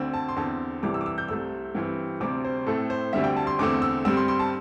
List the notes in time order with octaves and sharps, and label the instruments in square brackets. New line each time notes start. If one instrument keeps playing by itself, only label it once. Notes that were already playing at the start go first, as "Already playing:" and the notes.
Already playing: [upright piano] D2 D3 C4
A5
C6
E2 D3 C4 A5
C2 C3 E3 G3 D6
E6
D6
E6
G6
C2 C3 A3 C4 E6
G2 E3 C4
D2 C3 G3 C4 D6
C5
A2 A3 C4 A4
C5
D2 D3 G3 C4 E5
G5
A5
C6
E2 D3 A3 C4 D6
E6
G2 G3 C4 E6
C6
C6
A5